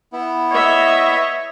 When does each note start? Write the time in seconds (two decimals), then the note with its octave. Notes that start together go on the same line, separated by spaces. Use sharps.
0.13 B3 E4
0.51 C#5 D#5 E5